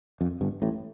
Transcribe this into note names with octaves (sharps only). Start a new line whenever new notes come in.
F2
G1 G2
A1 A2